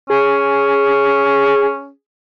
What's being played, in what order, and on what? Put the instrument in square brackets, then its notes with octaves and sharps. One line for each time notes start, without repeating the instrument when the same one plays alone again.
[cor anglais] C#4 [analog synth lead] G#4